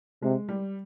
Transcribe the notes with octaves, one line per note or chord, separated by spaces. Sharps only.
C3 G#3
G3